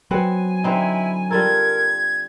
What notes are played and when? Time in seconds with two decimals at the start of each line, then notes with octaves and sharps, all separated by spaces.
0.11 F#3 B3 C4 F#5 G#5
0.64 D3 C4 D#4 E4
1.31 G3 F4 A4 A#4 G#6